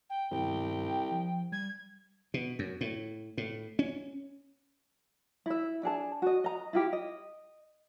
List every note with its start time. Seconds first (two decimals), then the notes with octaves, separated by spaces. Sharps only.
0.09 G5
0.31 C2 G2 C3 D#3 G5
1.12 F3
1.52 G3 G#6
2.34 B2
2.59 F#2
2.81 A2
3.38 A2
3.79 C#4
5.46 E4 E5
5.83 D4 G#4 A5
6.22 F#4 D#5
6.44 D#5 A#5
6.73 E4 F4 G4
6.93 D#5